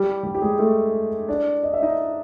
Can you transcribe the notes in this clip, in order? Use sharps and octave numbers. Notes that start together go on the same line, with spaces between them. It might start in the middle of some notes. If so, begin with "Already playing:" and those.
Already playing: G3 G4
G3 G4
G4
G#3 G#4
A3 A4
D4 D5
D#5
E5
D#4 D#5